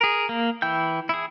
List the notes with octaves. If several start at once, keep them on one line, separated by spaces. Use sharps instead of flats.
G#4 A#4
A#3
E3 E4 G5 G6
E4 G#4